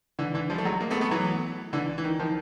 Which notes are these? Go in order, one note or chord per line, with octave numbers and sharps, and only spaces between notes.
D3 E3
D3 E3
F3 G3
A3
F#3 G#3
G#3 A#3
A3 B3
A3 B3
E3 F#3
D3 E3
E3
D#3
D#3 F3